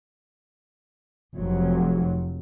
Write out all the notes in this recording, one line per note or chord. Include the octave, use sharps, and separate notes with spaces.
F1 F2 F#3